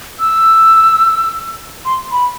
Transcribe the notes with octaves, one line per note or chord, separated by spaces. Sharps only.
E6
C6
B5